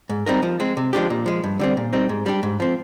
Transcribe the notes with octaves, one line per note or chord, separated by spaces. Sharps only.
G#2
G3 C4 D#4 A#4
F3
G#3 C4
C3
F3 G#3 D4 G4
A#2
F3 G#3
G2
D3 G3 C4
A#2
G3 C4 D#4
G#2
G3 D4 G4
G#2
F3 C4